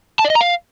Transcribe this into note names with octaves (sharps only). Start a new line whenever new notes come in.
A5
D5
D#5
A#5
F5